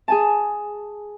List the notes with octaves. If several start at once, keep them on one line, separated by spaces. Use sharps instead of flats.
G#4 G#5 A5